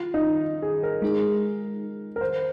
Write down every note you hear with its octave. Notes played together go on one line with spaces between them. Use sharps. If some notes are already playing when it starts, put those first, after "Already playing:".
Already playing: F4
D#4
G#4
A#4
G#3 D#4 G#4
A#4
C5